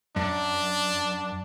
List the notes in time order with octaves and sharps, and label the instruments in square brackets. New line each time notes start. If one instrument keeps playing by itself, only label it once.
[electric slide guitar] F#2 [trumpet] D4